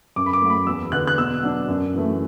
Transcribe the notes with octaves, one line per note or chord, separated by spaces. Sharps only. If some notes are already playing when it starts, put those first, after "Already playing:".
F#2 D6
B5
D6
F#3 A3
B5
E2 E6
D3 B3 F#6
F#6
B2 E6
F#3 D4
F#2
E3 A3